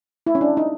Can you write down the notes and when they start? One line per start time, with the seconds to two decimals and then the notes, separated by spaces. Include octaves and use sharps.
0.27 E4
0.35 C#4
0.41 D4
0.57 D#4